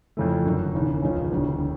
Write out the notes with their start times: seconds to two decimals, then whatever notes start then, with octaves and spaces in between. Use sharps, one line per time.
0.17 F2 C#3 E3 A3
0.45 F#1 F#2 D3
0.74 E1 D#2 C#3 E3
1.02 C#2 C#3 F3 G#3 C#4
1.31 E1 D2 C#3 E3 G3